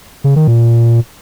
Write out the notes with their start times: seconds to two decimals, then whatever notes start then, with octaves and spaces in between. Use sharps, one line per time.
0.24 C#3
0.36 D#3
0.48 A#2